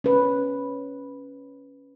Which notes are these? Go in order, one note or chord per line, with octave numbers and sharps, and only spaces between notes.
C#4 B4